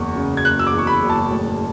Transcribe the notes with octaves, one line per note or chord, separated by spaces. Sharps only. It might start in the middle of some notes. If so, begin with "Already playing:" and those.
Already playing: F#1 E2 C#6
C#3
G#6
F#1 F#6
E6
D6
E2 C#6
B5
F#1
A5
A2